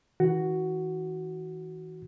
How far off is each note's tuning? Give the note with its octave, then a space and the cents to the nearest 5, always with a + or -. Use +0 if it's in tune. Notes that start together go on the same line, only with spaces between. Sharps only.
E3 -40 F#4 +5